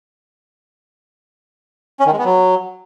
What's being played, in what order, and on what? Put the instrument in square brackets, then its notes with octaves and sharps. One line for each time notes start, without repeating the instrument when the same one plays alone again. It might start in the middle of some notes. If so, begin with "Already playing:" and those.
[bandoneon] C#4
D#3
G#3
B3
F#3